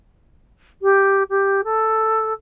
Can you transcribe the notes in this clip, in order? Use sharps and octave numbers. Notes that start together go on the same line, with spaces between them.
G4
G4
A4